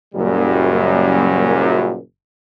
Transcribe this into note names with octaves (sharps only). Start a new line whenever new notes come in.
F#1 F#2 A#2 G3